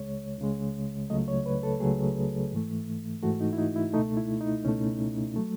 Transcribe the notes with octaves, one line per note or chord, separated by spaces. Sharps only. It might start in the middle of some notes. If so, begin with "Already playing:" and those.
Already playing: C#2 C#3 G#3 C#5
C#2 C#3 G#3
C#2 C#3 F#3 A3 D#5
C#5
B4
A4
C#2 C#3 F#3 A3 G#4
G#2 E3 A3
G#2 E3 A3 F#4
D#4
E4
D#4
E4
C#2 B2 A3 D#4
E4
D#4
C#2 B2 A3 C#4
F#3 A3